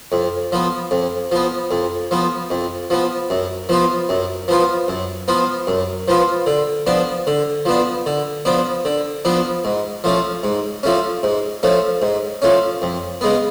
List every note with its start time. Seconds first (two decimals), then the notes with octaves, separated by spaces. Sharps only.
0.12 F2
0.52 F3 B3
0.91 F2
1.32 F3 B3
1.71 F2
2.11 F3 B3
2.50 F2
2.90 F3 B3
3.30 F#2
3.69 F3 B3 F4
4.09 F#2
4.48 F3 B3 F4
4.88 F#2
5.28 F3 B3 F4
5.67 F#2
6.08 F3 B3 F4
6.46 D3
6.87 F3 B3 D4
7.27 D3
7.65 F3 B3 D4
8.06 D3
8.45 F3 B3 D4
8.85 D3
9.25 F3 B3 D4
9.65 G#2
10.04 F3 A3 C#4
10.44 G#2
10.83 F3 A3 C#4
11.23 G#2
11.63 F3 A3 C#4
12.02 G#2
12.42 F3 A3 C#4
12.82 F2
13.21 C#3 G#3 B3